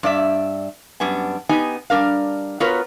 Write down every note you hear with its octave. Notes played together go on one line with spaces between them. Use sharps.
G2 D5 E5
F#2 G3 B3 D4 G#5
B3 D#4 G4 G#5
G3 D4 A#4 F5
B3 F4 F#4 A#4 B4 C#5